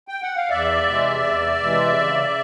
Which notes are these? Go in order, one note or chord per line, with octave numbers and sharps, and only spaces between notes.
G5
F#5
F5
E2 D5 E5
C3 E3 G#3
E2
C3 E3 G#3
C#3